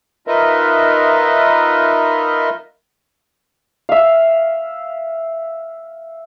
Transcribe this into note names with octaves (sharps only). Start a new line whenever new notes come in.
D#4 F4 A#4 B4 D#5 E5
E5 F5